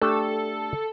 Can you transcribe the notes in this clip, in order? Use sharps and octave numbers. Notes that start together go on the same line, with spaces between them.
A3 D4 G4 A4